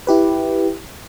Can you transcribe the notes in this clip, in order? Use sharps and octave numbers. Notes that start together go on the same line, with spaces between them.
E4 G4 B4